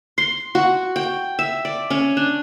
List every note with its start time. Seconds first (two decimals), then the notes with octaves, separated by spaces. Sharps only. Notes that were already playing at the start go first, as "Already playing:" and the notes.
0.18 C6
0.55 F#4
0.96 G5
1.39 E5
1.65 D5
1.90 C#4
2.17 D4